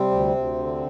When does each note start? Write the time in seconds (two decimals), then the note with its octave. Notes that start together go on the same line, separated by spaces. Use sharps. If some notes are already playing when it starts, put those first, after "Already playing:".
Already playing: C3 G3 C4
0.11 D2
0.35 D2
0.59 D3